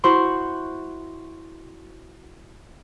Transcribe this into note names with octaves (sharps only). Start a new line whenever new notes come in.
E4 F#4 C5 C6 C#6